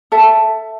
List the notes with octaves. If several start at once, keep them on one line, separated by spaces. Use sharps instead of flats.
A4 E5 A5